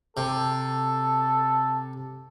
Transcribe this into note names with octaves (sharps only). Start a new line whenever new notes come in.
C3 A4